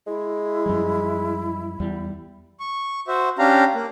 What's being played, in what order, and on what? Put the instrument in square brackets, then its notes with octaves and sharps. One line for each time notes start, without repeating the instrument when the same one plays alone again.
[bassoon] G#3 [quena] E4
[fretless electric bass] F#2 F3 G3
E2 G3
[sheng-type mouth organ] C#6
F#4 C5 E5
C#4 D4 G4 F5 A#5
A#3